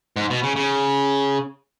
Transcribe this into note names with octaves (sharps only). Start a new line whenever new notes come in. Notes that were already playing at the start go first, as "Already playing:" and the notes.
G#2
B2
C#3
C#3